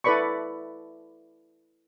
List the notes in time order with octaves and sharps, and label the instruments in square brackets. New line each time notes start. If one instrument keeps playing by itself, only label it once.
[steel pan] E4 A4 B4 D5 B5 C#6